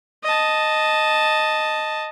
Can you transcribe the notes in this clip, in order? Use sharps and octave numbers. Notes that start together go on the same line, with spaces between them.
D#5 A5